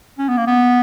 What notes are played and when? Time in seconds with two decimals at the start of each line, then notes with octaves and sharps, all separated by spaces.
0.18 C#4
0.29 B3
0.37 A#3
0.47 B3